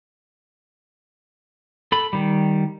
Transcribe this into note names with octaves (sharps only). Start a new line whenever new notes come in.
A4 B5
D#3 G3